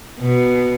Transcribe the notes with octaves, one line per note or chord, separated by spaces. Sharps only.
B2